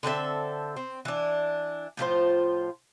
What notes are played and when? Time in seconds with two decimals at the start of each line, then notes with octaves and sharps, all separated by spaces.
0.03 D3 C4 A4 E5
0.76 C4
1.05 E3 D4
1.97 A2 F3 F4 C5